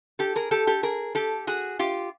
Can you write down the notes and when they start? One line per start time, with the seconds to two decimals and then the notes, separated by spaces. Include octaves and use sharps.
0.19 G4 A4
0.36 G#4 A#4
0.51 G4 A4
0.67 G4 A4
0.83 G#4 A#4
1.15 G4 A4
1.47 F#4 G#4
1.79 F4 G4